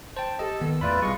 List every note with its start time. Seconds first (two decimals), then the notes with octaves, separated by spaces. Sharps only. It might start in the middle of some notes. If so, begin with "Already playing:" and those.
0.17 C5 G5 A5
0.39 G4 A4 D#5 E6
0.61 D#3 B3
0.81 E2 A2 A3 E4 F4 B4 D5 B5
1.02 B1 G3 G#3 F4 C#6